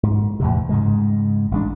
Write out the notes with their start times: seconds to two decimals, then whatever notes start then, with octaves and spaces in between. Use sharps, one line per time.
0.03 G#2
0.40 E2 A2 C3
0.69 G#2 C#3 G#3
1.51 A1 G#3 D4